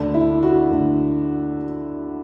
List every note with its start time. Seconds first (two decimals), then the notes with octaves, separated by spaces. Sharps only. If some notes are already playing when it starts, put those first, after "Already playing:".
Already playing: D2 D3 D4
0.14 E4
0.43 F#4
0.71 D2 D3